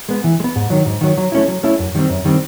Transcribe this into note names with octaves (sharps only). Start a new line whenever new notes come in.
G#3 B3
E3
G#3
B3
G#2
D#3 F#3
G#2
D#3 F#3
F#3
A3 C#4 E4
F#3
A3 C#4 E4
F#2
D#3 G3 C4
F#2
D#3 G3 C4